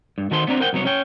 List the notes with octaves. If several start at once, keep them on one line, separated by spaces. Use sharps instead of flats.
G2
D#3 F#4 A4 C5 C6
B3 C4 D4 A#5
A#4 C5 F#5 G5
C2 F#3 B3 C#5
C#4 C#5 G5